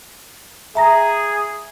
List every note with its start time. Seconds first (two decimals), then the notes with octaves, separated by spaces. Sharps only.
0.75 G#4 E5 A#5 A#6